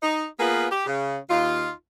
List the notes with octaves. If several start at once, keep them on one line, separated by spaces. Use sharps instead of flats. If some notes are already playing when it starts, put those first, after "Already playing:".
D#4
A#3 B3 F4 G#4 B4
G4
C#3
D#2 D#4 F4